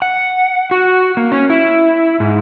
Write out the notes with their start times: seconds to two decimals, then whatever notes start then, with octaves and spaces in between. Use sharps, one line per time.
0.02 F#5
0.71 F#4
1.17 A#3
1.32 C#4
1.50 E4
2.20 G#2